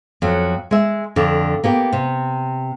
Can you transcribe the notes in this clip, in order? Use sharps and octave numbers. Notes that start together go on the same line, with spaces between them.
F2 F#3
G#3 E5
F2 D3
A#3 B3 G4
C3